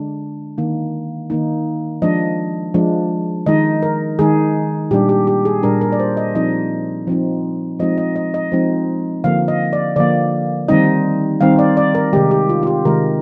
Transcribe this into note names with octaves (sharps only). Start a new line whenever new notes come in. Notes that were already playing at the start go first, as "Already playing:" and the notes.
Already playing: D3 G#3 D4
D#3 A#3 D#4
D#3 A#3 D#4
F3 G#3 D4 D#5
F3 G#3 D4
D#3 G#3 D#4 D#5
A#4
D#3 G#3 D#4 G#4
A#2 G3 D4 G4
G4
G4
G#4
A#2 G3 D4 A#4
A#4
D5
C5
D#5
F3 C4 D#4 D#5
F3 C4 D#4
F3 G#3 C4 D#4 D#5
D#5
D#5
D#5
F3 G#3 C4 D#4
D3 F3 A#3 F5
D#5
D5
D3 F3 A#3 D5
D#3 G3 C4 D#4 D#5
D#3 G3 C4 D#4 F5
D5
D5
A#4
C3 D#3 G#3 G4
G4
F4
F4
G4
C3 D#3 G#3 A#4